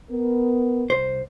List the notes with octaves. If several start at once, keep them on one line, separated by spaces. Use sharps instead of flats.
B3 A#4
C2 C5